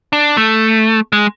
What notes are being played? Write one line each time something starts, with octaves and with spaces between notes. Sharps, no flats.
D4
A3
G#3